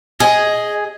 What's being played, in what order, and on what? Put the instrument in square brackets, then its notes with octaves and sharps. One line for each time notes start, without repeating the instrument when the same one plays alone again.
[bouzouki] G#4 [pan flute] D#5